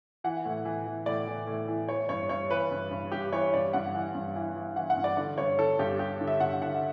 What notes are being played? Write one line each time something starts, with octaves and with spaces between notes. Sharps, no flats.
E3 F#5
A2
E3
E3
A2 D5
E3
A2
E3
E3 C#5
G2 C#5
G2 C#5
E3 B4
G2
G2
G2 G4
E3 C#5
G2 D5
G2 F#5
E3
G2
E3
E3
E3 F#5
F#5
G2
D5
D3 D5
G2 C#5
D3 A4
G2 G4
G2 G4
D3
E5
G2 F#5
D3 F#5